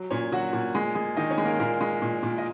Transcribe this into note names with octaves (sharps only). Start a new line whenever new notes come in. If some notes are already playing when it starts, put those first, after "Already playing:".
Already playing: F#3
A#2 C#4 C#5
F#3 F#4 F#5
A#2
G#3
G#3
D#3 D#4 D#5
C#4 C#5
G#3
A#3 A#4
A#2 A#3 A#4
G#3
A#2
A#2
D#5